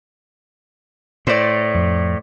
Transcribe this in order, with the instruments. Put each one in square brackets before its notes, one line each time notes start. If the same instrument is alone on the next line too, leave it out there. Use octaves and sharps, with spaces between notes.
[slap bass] A2 [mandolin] C5 D5
[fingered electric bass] F2